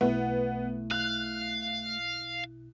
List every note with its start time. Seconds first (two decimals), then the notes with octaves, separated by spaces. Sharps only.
0.01 B1 B2 A3 B3 E4
0.91 F5 F#6